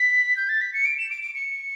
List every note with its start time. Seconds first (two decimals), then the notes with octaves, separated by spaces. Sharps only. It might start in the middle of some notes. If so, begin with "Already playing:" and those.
Already playing: B6
0.36 G6
0.49 A6
0.61 B6
0.73 C#7
0.85 D7
0.98 E7
1.10 D7
1.22 D7
1.34 C#7